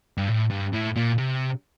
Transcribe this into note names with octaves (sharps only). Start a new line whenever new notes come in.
G2
A2
G2
A2
A#2
C3